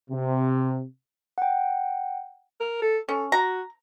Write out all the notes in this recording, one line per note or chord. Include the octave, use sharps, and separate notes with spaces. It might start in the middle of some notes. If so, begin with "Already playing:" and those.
C3
F#5 G5
A#4
A4
C#4 A4
F#4 A#5